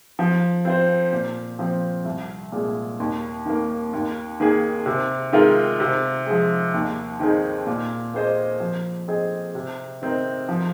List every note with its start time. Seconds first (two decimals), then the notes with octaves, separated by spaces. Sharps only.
0.19 F3
0.65 C4 F4 C5
1.13 A#2
1.59 F3 C4
2.05 C2
2.52 A#2 G#3
3.00 D#2
3.46 D#3 A#3
3.93 D#2
4.40 D#3 A#3 G#4
4.86 C3
5.33 D#3 G#3 F4 A#4
5.80 C3
6.26 F3 G#3
6.74 D#2
7.20 D#3 C4 D#4 G#4
7.67 A#2
8.14 A#3 G#4 C5 D#5
8.60 F3
9.08 C4 G#4 D#5
9.55 C3
10.02 D#3 C4 D#4 A#4
10.49 F3